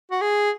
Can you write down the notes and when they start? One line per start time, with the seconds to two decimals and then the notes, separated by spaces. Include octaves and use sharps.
0.11 F#4
0.22 G#4